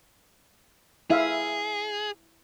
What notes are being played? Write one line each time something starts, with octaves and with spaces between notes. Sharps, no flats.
E4 G#4 E5 F5